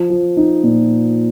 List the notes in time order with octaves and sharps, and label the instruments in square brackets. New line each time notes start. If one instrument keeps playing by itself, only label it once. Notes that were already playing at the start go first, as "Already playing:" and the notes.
Already playing: [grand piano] F3
F3
D#4
A#2